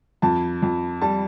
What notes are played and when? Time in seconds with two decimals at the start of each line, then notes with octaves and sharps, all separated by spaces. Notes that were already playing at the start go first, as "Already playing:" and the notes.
0.22 F2 A5
0.62 F2
1.02 G3 A5